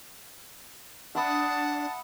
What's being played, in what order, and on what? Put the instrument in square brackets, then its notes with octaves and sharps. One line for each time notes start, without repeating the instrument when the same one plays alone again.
[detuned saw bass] D4 [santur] E5 B5 D#6 [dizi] F#5 [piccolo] A5